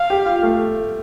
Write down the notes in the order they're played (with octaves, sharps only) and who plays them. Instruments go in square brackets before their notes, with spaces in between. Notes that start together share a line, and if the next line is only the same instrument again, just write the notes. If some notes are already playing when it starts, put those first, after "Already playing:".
Already playing: [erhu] F5
[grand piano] G4
F4
A3